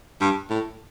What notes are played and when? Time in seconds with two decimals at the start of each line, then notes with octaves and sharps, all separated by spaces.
0.21 G2
0.50 A2